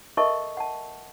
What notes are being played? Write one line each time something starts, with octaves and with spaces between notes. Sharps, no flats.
A4 A#4 D#5 E5 A5 C#6
F#5 A5